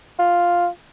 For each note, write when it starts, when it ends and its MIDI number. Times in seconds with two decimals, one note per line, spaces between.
0.19 0.68 65